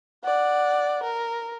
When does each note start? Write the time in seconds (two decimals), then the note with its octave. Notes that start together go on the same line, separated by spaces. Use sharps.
0.24 D5 F#5
1.03 A#4